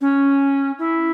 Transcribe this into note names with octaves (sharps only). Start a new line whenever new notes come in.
C#4
E4